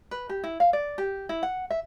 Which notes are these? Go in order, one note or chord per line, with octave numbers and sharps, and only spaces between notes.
B4
G4
E4
F5
D5
G4
E4
F#5
E5